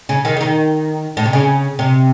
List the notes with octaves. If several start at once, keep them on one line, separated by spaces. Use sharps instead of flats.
C#3
D#3
C#3
D#3
A2
C3
C#3
C3